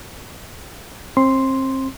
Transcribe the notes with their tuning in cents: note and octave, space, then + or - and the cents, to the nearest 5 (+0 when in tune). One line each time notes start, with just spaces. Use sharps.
C4 +30 C6 +0